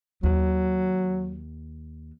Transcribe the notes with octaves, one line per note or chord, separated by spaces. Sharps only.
D#2 F#3